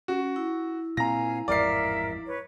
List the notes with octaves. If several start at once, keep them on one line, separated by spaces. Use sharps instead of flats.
C#4 F#4
E4
A#2 A#3 C4 F5 G#5 A#5 A#6
A1 F2 G#2 A#4 D5 E5 F5 C7
B4 C#5